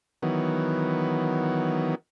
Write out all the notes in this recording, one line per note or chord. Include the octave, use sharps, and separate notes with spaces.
D#3 E3 F#3 B3